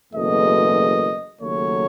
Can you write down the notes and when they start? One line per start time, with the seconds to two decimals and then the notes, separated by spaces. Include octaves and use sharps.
0.13 F#1 E2 B2 A3 D#5
1.38 D#2 C#3 F#3 A3 C#5